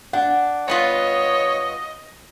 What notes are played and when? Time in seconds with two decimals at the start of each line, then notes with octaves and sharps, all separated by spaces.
0.13 D4 F#5
0.68 G2 B3 F4 C#5 D#5